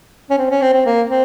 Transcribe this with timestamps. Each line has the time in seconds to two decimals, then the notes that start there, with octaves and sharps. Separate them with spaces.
0.30 C#4
0.38 C4
0.50 C#4
0.61 C4
0.74 C4
0.86 A#3
1.10 C4